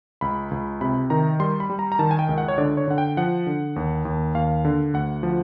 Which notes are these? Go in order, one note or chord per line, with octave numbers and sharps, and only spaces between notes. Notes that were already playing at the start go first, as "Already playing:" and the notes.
C#2 B5
C#2
C3 B5
D#3 A#5
G3 C6
B5
G3
A#5
A#5
D#3 A5
G#5
G5
C#2
F#5
C#5
D3 D5
C#5
D3 F#5
G5
F3 F#5
D3
D#2
D#2
D#2 F5
D3
D2 F#5
F3